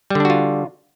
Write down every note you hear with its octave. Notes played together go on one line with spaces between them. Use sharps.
D3 G3 D4 F4 F#4